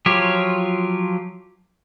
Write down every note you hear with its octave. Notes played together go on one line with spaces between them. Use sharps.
F3 F#3 F4 G4 C#5